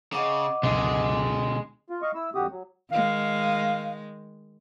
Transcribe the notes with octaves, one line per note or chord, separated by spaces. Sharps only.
C#3 D#5 F#5 D6
C#2 F#2 B2 D3 G#3
F4
D#5 F5 C#6
E4 E6
F2 D3 F#4 G4 D#6
F#3
D#3 G#3 F5